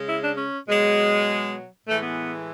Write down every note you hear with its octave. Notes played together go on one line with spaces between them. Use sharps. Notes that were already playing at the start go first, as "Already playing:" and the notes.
Already playing: C#3 G#3
E4
D4
C#4
B2 F#3 G#3
A2 E3 G#3 A3
B3